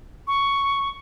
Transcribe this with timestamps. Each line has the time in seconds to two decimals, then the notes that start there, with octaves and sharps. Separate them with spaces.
0.27 C#6